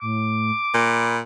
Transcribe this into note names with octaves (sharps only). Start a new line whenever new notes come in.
A2 D6
A#2 B5